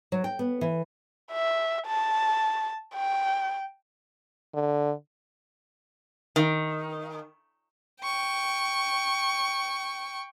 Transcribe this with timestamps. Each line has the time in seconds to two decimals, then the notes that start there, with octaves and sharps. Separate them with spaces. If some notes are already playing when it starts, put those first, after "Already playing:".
0.12 F#3
0.24 G5
0.39 B3
0.61 E3
1.32 E5
1.87 A5
2.94 G5
4.54 D3
6.36 D#3
8.03 G5 C#6